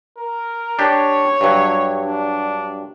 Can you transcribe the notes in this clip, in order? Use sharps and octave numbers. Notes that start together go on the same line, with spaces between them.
A#4
D4 G4 C#5
G2 F#3
D4